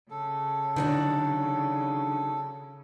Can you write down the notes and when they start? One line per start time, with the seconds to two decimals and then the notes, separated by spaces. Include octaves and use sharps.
0.10 C#3 A4
0.76 D3 D#3 F#3 D4